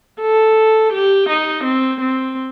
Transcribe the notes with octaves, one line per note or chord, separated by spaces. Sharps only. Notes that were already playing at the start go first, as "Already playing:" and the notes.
A4
G4
D#4
C4
C4